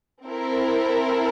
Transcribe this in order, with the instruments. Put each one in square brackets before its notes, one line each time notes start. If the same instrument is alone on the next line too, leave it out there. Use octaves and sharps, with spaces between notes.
[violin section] C4 E4 A4 A#4